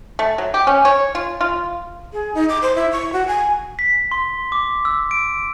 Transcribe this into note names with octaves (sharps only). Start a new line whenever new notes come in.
A3
F#3
G4
C#4
C#5
F4
F4
G#4
D#4
D6
C5
E4
C#6
F#4
G#5
B6
C6
D6
E6
D7